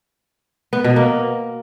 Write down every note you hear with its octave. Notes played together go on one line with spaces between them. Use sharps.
B3
B2
A#3